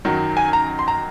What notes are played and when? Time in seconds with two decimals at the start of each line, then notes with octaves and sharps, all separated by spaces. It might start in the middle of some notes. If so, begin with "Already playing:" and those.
0.05 F#2 D#3 F#3
0.37 G#5
0.53 A#5
0.79 C6
0.88 A#5